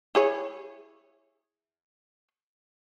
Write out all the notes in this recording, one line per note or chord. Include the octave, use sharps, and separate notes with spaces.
E4 G#4 C#5